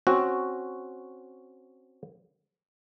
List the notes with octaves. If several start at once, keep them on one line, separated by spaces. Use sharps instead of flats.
C4 C#4 F#4